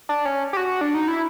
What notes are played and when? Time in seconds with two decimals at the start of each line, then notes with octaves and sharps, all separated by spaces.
0.09 D4
0.25 C#4
0.53 G4
0.57 F#4
0.81 D4
0.94 D#4
1.08 E4